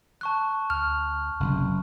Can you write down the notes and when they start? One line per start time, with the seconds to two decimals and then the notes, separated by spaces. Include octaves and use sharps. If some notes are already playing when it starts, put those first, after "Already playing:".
0.21 A5 C#6 F#6
0.70 D2 F6
1.40 F#1 C3